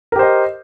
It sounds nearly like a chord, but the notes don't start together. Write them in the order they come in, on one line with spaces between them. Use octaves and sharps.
A#4 G4 C5 D#5